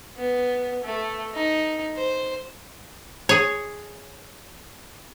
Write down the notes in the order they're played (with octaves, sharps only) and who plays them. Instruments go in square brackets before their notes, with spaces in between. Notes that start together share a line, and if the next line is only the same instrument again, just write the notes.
[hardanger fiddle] B3
A3
D#4
C5
[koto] G#4 C#5